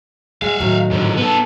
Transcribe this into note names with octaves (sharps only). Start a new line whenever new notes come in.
G#3 E5 F5
A2 D#3 F#3
G#2 D3
B3 A4